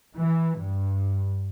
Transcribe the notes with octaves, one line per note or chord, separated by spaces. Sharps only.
E3
G2